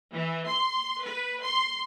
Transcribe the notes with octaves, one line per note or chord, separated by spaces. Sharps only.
E3
C6
B4
C6